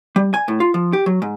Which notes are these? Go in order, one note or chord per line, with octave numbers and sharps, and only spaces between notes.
G3
G#5
A2
F4
F3
G4
F#3
G#2